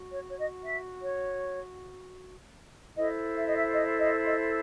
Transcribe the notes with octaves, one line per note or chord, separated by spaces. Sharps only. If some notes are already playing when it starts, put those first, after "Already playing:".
Already playing: F#4
C#5
C#5
D#5
E5
C#5
E4 A4 C5 D#5
E5
D#5
E5
D#5
D#5
D#5